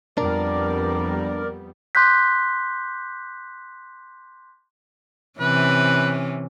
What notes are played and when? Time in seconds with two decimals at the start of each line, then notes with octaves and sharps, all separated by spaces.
0.18 F2 G3 B3 D4 A#4 D5
1.95 C6 D6 F#6 G6 B6
5.40 C3 E3 C#4 B4